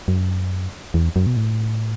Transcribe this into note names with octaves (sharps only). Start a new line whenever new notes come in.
F#2
E2
F#2
B2
A2